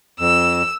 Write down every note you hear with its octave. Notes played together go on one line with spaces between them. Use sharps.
F2 E6